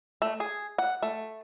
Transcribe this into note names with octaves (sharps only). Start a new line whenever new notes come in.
A3
G#4
F#5
A3